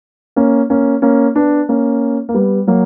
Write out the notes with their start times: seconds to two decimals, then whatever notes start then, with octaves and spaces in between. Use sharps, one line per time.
0.36 A#3 C#4
0.70 A#3 C#4
1.02 A#3 C#4
1.36 B3 D4
1.69 A#3 C#4
2.29 A#3
2.34 G3 B3
2.67 F#3 A#3